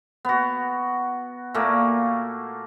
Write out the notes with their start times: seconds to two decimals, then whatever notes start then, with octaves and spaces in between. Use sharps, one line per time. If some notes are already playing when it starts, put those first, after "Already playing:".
0.25 B3 F#4
1.54 A#2 A3 A#3